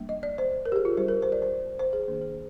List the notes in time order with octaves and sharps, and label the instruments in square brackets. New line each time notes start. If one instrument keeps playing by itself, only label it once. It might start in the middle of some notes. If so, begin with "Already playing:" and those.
Already playing: [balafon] G3 A#3 D4
D#5
D5
C5
A#4
G4
G#4
F4
G3 D4 C5
A#4
C5
D5
C5
C5
G#4
D#3 A#3 D4
G#4